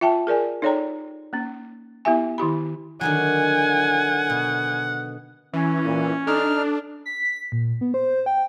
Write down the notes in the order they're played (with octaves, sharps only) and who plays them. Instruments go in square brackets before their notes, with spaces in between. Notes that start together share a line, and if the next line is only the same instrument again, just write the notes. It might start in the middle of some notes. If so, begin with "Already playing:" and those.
[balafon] F4 E5 G5 A5
G#4 A#4 D5 G#5
D#4 A4 C#5 D5 G5 A#5
A#3 C#4
B3 E4 G4 E5 G#5
D#3 E4 G4 B5
[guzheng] D3 D#3 F#3 [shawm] F#5 [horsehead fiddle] G#5
[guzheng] B2
[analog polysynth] E3 [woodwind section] C#4
[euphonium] A#2
[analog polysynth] D4 [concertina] D#4 F6 [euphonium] A4
[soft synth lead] B6
A#2
B3
C5
G5